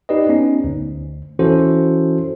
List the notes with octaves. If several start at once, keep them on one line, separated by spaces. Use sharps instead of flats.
D#4 G4 B4 D5 D#5
B3 C#4 D#4
D2
E3 C#4 E4 F#4 A4 C5